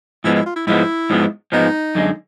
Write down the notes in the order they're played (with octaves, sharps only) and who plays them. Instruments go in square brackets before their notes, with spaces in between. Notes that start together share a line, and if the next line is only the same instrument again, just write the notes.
[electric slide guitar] G#2 F3 G#3 B3 [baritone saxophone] E4
[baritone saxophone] E4
F4
E4
[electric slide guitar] G#2 F3 G#3 B3 [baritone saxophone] E4
[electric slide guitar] G#2 F3 G#3 B3
[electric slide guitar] G#2 F3 G#3 B3 [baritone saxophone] D#4
[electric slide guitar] F#2 D3 G#3